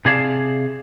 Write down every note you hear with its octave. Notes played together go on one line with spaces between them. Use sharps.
C3 G#4 D5 F5 A5